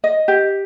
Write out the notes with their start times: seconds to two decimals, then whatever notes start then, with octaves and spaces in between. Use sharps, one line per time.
0.04 D#5
0.28 G4